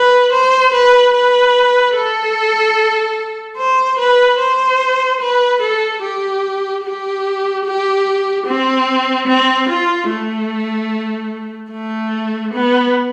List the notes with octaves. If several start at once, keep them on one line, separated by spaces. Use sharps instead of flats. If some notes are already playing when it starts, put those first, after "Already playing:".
Already playing: B4
C5
B4
B4
A4
C5
B4
C5
B4
A4
G4
G4
G4
C4
C4
F4
A3
A3
B3